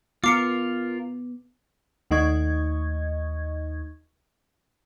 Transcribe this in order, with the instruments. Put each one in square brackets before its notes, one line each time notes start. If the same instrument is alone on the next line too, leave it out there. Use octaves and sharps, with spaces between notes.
[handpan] B3 [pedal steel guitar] F4 A#4 [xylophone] D6 C7 C#7
[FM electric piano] D#2 A3 D#4 D#5 C#6 G#6